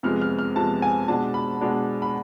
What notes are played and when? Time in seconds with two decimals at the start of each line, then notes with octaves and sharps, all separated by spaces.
0.03 F2 C3 G#3 B3 F6
0.21 F6
0.39 F6
0.56 F2 C3 G#3 B3 A5
0.82 G#5
1.08 B2 G#3 D4 A5
1.34 B5
1.61 B2 G#3 D4
2.02 B5